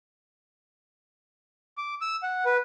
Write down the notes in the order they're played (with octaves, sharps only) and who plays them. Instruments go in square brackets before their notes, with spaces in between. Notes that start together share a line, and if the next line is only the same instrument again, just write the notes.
[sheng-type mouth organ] D6
E6
F#5
B4